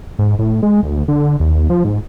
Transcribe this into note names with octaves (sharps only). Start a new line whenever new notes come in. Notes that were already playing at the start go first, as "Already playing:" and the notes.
G#2
A2
G#3
D2
D3
D#2
F3
G#2